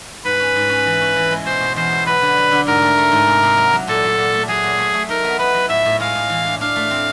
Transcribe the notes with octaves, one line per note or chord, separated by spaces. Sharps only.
G#2 B4
C#4
G#2
C#4
E3
C#4
E3
G#3
B2 C5
B2
E2 C5
B2
F#3 B4
D3
F#3
D3
G#2 A#4
A3
A3
G#2
C3
C3
F#3
F#3
A#2 A4
F#3
A#2
A3
F#3 G#4
A#2
A3
A3
D#4 A#4
B3
B3 B4
F#3
A2 E5
A2
G#3 F5
A2
E3
D4
D4 F5
A3
C4